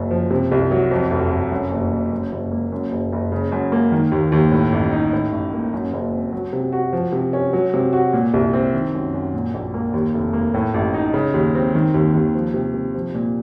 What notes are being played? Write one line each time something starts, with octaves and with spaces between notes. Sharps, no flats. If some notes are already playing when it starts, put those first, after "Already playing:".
Already playing: F#1 F#2
F3
C3
C2
F#3
F2
F1
F1
F#2
F#1
F#1
F#2
F#1
A#3
F#2
F#1
F#1
C#3
F#2
A#3
D#3
D#2
D#2
A2
A1
D#4
A2
A1
A#3
F#2
F#1
C4
F#3
C3
F#4
F3
C3
C#4
F#3
C3
F#4
A#2
C2
C4
D#3
F#2
F#2
A#2
A#1
A#3
D#2
F1
A#3
A2
A1
D#4
C#3
D#2
C4
D#3
D#2
D#2
F3
C3
C3
F3
A#2